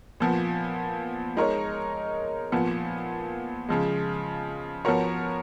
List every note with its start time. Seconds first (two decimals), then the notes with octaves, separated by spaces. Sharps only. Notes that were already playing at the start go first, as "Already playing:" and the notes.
0.20 A#2 F3 B3
1.36 G#3 D#4 A#4 C#5
2.52 A#2 F3 B3
3.69 C#3 F3 G#3
4.85 F3 B3 F#4 A#4 C#5